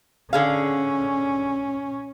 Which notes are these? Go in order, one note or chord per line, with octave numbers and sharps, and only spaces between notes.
D3 C#4 G#4 F5